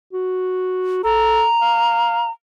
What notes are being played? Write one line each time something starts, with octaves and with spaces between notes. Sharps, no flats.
F#4
A4 A#5
F5